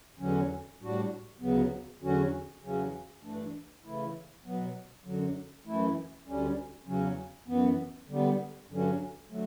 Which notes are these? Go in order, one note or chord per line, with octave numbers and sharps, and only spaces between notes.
E2 D3 F#3 C#4
A2 G3 D4 F#4
D2 C#3 F#3 B3
E2 D3 F#3 C#4 F#4
E2 C#3 F#3 C#4
G2 E3 A3 D4
C#3 E3 A3 E4
B2 F#3 B3
F#2 D3 F#3
F#2 E3 A3 E4
D2 D3 G3 C#4
E2 C#3 F#3 C#4
F#2 E3 B3
D3 G3 B3
G2 D3 F#3 C#4
D3 F#3 A3